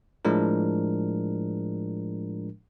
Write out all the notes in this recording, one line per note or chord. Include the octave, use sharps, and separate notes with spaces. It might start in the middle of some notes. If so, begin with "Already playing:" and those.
A2 F3 G#3 D4 A#4